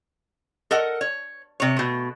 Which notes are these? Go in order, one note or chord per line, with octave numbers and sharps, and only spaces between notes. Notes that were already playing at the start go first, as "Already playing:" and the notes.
A4 A#4 D#5 F#5
C#5
C3 C#5
B2 A3